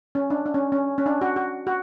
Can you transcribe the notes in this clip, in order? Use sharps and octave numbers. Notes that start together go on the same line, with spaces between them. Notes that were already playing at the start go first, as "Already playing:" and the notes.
C#4
D4
D4
C#4
C#4
C#4
D4
F#4
F#4
F#4